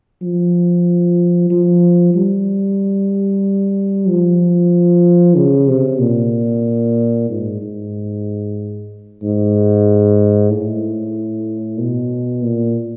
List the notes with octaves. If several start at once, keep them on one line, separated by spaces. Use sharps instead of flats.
F3
F3
G3
F3
C#3
C3
A#2
G#2
G#2
G#2
A2
B2
A#2